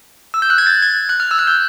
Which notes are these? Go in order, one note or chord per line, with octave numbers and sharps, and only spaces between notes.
E6
G6
F#6
G#6
A6
G#6
F#6
F6
E6
F#6
G6